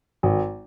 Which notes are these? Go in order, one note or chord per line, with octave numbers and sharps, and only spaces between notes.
G#1